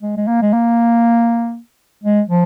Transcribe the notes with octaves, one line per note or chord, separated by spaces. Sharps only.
G#3
G#3
A#3
G#3
A#3
G#3
F3